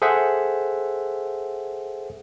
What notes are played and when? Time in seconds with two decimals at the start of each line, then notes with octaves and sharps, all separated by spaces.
0.02 G#4 A4 C5 E5 F#5